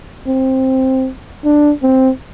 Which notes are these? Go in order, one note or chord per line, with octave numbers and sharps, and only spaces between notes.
C4
D4
C4